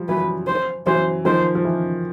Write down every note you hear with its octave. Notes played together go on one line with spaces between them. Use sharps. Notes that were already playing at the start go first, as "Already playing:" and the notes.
Already playing: F3 G3
E3 F#3 B4
C5
E3 F#3 C5
D#3 F3 C5
F3
E3